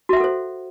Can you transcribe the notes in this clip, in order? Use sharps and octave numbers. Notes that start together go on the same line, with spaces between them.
F#4 A4 C5 E5 F#5